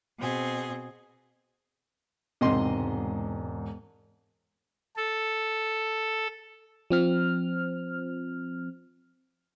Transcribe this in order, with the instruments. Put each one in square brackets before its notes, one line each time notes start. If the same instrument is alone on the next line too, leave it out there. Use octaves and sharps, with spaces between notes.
[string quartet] B2 C4 G#4
[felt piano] E1 G#2 [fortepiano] C3 D#5 C6
[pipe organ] A4
[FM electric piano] F3 C4 F6